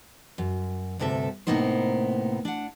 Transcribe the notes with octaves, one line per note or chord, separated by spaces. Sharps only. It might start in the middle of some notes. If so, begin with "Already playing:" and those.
F#2
D2 G2 C3 A4 E5
A2 C3 A#3 B3 D#4 C5
D4 F#5